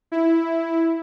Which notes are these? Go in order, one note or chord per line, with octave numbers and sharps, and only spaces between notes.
E4